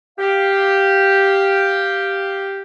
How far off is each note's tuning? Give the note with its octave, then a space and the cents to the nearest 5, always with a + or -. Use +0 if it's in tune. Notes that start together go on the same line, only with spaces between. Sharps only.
G4 +0 F5 +0